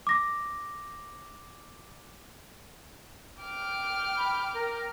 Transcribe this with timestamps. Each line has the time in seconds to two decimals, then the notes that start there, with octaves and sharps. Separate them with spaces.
0.07 D6 A#6
3.42 G5 D6 F6
4.17 B5
4.54 A#4